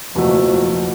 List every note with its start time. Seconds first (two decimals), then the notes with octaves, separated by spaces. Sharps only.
0.15 F#1 E2 B2 F3 F#3 A3